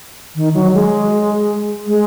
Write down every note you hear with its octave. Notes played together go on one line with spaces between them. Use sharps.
D#3
F#3
G#3
G#3